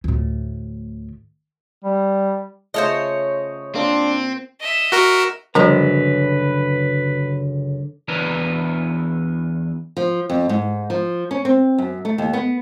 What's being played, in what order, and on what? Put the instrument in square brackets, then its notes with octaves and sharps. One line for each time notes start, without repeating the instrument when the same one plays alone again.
[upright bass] D2 A2
[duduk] G3
[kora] C#3 A3 F4 [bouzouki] C5 C#5 D#5
[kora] A#3 F4 [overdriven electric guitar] C4 [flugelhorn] D4
[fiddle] D#5 E5
[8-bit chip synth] F#4 A#4
[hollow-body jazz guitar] C#2 F#2 A#5 [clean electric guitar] D3 [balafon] F3 G3 A#4 [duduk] B4
[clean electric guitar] E2 E3 D4 A#4 B4 A#5
[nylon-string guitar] F3
F2
G#2
F3
C#4
C4
F#2
A3
D#2
B3